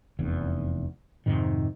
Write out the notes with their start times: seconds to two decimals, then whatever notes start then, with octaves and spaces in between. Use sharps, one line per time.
0.19 F1 E2
1.26 F2 G#2 C3 D#3